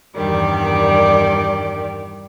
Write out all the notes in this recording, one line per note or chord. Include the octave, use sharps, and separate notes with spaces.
E2 G2 D#3 G3 D5